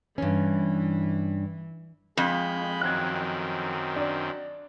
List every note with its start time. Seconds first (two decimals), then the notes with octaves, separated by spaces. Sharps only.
0.18 G2 E3 C#4
2.17 F2 G#3 B5 G6
2.81 F#2 D#3 C4 F#6 G#6
3.96 D4